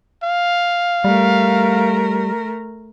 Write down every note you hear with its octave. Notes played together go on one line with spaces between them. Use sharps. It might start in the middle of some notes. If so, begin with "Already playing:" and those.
F5
G3 A3 A#4